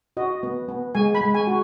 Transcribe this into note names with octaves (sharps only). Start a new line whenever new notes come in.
F#4 D#5
B3
B3
G#3 G#5
B5
G#3
G#5
F#4